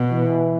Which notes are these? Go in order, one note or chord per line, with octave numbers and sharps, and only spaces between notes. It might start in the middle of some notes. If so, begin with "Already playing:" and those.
Already playing: B2
E3